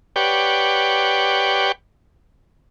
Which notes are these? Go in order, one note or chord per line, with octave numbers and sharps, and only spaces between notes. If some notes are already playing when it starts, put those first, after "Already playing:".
G4 B4 C#5 D5 F#5 G5